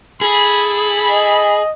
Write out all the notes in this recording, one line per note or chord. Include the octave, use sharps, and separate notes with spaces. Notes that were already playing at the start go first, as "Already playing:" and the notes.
E4 G#4 A4 B5
D#5